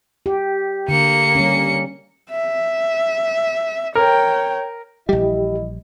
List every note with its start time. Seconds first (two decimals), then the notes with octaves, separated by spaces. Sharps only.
0.26 G4
0.88 D3 A#3 C#7
1.35 G3 C#4
2.31 E5
3.95 A#4 C#5 G5
5.09 A#1 E3 G3 E4 G4 D#5